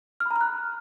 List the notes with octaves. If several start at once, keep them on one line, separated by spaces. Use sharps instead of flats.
F6
B5
A#5
F6
F#6